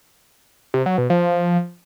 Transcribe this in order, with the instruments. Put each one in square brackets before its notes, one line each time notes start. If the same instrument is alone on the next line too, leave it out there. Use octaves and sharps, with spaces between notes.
[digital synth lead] C3
F#3
B2
F3